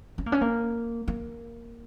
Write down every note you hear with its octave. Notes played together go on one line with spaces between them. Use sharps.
C#4
A#3
C#4
A#3
A#3